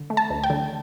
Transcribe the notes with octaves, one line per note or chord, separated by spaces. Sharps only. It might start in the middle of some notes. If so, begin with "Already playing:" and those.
Already playing: D3
A3
A5
D2
G5
D3